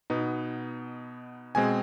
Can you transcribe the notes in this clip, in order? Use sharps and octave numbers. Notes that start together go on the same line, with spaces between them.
B2 B3 D#4
B2 G#3 C4 G#5